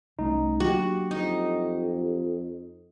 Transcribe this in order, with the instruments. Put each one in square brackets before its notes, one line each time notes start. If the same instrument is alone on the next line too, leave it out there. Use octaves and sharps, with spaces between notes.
[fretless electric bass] C2 A3 C#4 [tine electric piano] D#4
[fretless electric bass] F#3 A#3 D4 [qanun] F#4 [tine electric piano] G4
[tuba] F2 [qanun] D#4